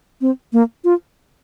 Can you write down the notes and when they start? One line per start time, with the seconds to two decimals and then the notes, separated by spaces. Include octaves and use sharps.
0.21 C4
0.53 A#3
0.84 F4